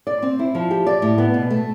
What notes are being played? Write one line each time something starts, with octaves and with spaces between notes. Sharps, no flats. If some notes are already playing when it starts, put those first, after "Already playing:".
D5
C4
E4
F3
G4
D5
A2
B3
B2
A3